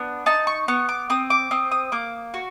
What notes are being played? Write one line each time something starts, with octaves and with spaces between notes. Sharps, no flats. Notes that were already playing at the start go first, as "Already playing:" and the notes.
Already playing: B3 D4
D#4 A5
C#6
B3 C#6
D6
C4 D#6
D6
C4 D#6
D#6
A#3 D6
F#4